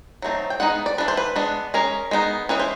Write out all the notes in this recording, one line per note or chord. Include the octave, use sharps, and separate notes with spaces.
F#3 A3 C4 D#4
G5
G#3 B3 D#4 F#5
D5
E3 A3 D4 B4
C5
B4
G#3 B3 D4
G#3 C#4 A#4
G#3 B3 D#4
E3 G#3 C#4 B4
C5